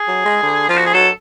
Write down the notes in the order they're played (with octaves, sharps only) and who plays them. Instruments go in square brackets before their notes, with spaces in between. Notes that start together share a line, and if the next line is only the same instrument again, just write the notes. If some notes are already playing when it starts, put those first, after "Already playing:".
Already playing: [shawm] G#4
[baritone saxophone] F#3
G#3
D3
[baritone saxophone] F3 [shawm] F4
[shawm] F#4
G#4
[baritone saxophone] F#3 [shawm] A4